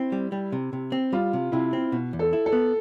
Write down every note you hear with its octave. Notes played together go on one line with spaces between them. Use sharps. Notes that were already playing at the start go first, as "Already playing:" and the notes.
Already playing: C4 E4
G3
G3
C3
C3
C4
G3 F4
C3
C3 E4
C4
B2
E2
A4
E4
A4
B3